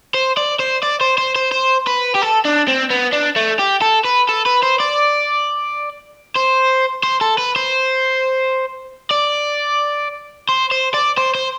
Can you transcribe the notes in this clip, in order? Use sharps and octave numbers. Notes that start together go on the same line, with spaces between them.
C5
D5
C5
D5
C5
C5
C5
C5
B4
G4
A4
D4
C4
B3
D4
A3
G4
A4
B4
A4
B4
C5
D5
C5
C5
A4
B4
C5
D5
C5
C5
D5
C5
C5